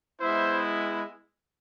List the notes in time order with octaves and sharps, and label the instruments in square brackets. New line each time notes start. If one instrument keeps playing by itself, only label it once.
[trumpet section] G#3 B3 E4 C5 E5